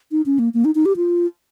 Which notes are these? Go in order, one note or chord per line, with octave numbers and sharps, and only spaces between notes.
D#4
C#4
A#3
A#3
D#4
D#4
G4
F4